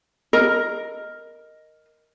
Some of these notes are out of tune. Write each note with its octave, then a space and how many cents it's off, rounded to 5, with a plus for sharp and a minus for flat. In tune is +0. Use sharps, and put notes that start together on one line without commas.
A#4 +0 D#5 +0